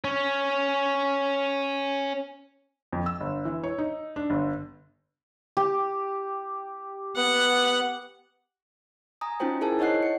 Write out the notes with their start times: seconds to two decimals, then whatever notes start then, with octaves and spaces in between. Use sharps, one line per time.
0.04 C#4 C#5
2.93 F2
3.06 E6
3.20 G1
3.45 E3
3.64 C#5
3.78 D#4
4.16 D4
4.30 G1
5.57 G4
7.17 B3 F#5
9.21 G#5 A#5 D#6
9.40 C#4 D#4 F4 F#4 C5 G5
9.61 E4 G#4 A#4 C5 G#5 A5
9.79 D#4 C#5 D#5 F#5 F#6 C7
10.03 C#7